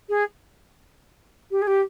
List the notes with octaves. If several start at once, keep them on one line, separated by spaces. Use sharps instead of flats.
G#4
G4
G#4
G4